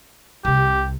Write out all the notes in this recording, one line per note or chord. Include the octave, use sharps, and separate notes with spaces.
C2 C3 G4